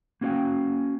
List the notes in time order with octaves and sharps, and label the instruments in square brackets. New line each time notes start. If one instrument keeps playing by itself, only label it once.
[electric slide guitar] A#3 C#4 F#4 C#5 F5 G5